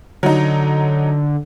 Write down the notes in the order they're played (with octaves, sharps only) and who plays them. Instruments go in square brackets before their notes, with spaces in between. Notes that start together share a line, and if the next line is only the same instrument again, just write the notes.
[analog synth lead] D3 [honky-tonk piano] F#3 D#4